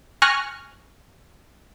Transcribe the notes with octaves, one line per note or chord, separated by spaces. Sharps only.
G#5 C#6 F6 F#6 A#6